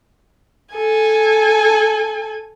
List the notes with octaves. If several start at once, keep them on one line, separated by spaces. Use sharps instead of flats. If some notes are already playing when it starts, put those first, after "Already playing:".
A4 G#5